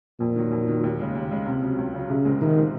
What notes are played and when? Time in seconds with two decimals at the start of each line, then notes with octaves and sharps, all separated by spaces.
0.20 F2 A#2
0.36 D#3 F#3
0.52 F2
0.68 D#3 F#3
0.84 D#2
0.99 C#3 G#3
1.15 D#2
1.31 C#3 G#3
1.46 C#2 C3
1.62 C#3 F#3
1.78 C#2
1.94 C#3 F#3
2.09 C2 C#3
2.25 A#2 G#3 C4
2.41 C2 D#3
2.57 A#2 G#3 C4